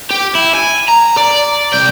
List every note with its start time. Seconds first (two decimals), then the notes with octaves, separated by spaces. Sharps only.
0.11 G4
0.35 E4
0.55 G#5
0.88 A#5
1.17 D5
1.73 C2 G5